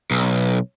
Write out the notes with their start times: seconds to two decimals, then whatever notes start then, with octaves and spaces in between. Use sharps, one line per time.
0.11 B1